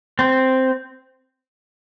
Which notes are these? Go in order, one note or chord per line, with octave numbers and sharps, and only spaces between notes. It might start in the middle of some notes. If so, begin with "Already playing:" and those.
C4